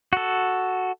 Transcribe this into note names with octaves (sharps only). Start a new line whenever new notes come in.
F#4 A4